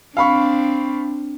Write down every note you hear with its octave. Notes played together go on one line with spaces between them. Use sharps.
C4 D4 F5 B5 C#6